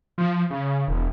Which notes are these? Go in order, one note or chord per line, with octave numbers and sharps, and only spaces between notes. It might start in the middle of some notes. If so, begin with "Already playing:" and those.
F3
C#3
E1